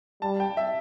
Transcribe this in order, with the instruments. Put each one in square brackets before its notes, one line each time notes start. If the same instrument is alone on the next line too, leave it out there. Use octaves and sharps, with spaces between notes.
[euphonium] G3 [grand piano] A5
[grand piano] G5
E5